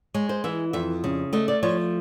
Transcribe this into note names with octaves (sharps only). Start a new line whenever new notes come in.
G#3 C#5
C5
E3 E5
F2 E5
C#3
A3 D#5
D5
F3 C#5